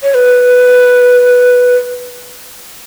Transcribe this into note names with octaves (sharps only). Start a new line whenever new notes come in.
C#5
B4